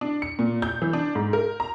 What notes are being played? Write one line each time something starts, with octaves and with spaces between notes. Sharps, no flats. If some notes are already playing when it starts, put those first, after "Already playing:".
D4
C#7
A#2
G6
E3
D4
G#2
A#4
A#5